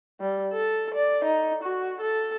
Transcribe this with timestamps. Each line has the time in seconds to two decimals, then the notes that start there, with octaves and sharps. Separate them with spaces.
0.21 G3
0.53 A4
0.94 D5
1.24 D#4
1.63 F#4
2.01 A4